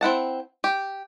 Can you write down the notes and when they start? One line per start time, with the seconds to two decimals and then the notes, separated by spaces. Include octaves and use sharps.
0.01 C4 E4 F#5 A5
0.64 G4